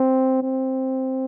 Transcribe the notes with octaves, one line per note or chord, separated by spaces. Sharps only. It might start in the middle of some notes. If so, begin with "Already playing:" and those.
Already playing: C4
C4